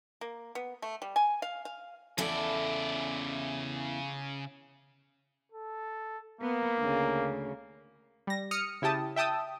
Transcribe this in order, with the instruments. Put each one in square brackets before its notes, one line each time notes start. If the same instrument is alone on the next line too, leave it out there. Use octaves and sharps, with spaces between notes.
[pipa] A#3
B3
A3
G3
G#5
F5
F5
[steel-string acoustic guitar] E2 E4 A4 [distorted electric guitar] C#3 D5
[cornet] A4
[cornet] A#3 [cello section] B3
[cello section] D2 C#3
[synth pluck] G3 A#6
D#6 F6 C#7
C#3 E4 G4 G5 A5 D#6
E5 G5 A5 D#6 E6